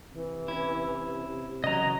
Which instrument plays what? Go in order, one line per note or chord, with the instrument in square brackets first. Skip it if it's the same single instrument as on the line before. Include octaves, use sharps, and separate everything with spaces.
[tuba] C3 [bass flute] E3
[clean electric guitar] C#4 E4
[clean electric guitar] C#3 E3 [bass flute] F#3 [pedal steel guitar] D#5 A#5